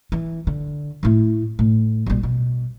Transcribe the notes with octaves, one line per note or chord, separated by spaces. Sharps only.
E3
D3
A2 E4
A2
A#1 G3
B2